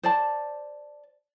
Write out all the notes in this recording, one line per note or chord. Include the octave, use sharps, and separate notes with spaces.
C5 D5 A5